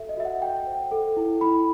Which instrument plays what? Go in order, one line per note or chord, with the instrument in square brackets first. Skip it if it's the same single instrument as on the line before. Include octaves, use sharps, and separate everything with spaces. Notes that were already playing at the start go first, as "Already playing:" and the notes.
Already playing: [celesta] F#4 A4 E5
D#5
F#4 E5
F#5
F#4 G5
C5
A4
E4
E4 B5